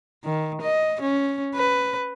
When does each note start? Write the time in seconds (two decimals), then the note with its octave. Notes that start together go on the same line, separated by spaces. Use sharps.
0.24 D#3
0.61 D#5
1.01 C#4
1.55 B4